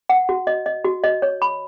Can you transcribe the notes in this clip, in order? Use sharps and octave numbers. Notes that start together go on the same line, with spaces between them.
F#5
F#4
D#5
D#5
F#4
D#5
C#5
B5